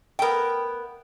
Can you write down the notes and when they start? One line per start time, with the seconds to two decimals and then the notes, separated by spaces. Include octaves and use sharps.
0.19 A3 B3 A#4 G5